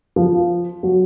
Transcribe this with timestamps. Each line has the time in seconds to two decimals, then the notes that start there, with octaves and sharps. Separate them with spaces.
0.16 F3
0.83 F#3